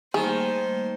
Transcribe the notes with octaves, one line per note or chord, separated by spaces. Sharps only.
D#3 G3 A3 A#3 G#4 C5